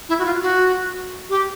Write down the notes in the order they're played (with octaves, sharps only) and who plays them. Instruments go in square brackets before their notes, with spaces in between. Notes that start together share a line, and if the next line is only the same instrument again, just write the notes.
[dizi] E4
F#4
F4
F#4
G4